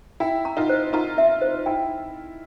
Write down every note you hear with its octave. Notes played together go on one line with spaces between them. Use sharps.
E4 G5
A#5
D#4 F4
C5
D#4 F4 A#5
E5
C5
E4 G5